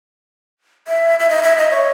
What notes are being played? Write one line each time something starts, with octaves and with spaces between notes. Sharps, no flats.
E5
E5
D#5
E5
D#5
C#5